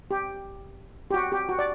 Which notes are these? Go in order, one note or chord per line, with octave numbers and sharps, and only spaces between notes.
G4
G4
F#4
G4
F#4
D5